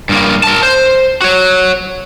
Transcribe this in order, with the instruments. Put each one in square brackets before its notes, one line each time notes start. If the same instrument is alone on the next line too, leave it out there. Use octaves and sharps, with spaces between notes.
[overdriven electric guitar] G2 A#3
A#4 A5
C5
F#4 C#5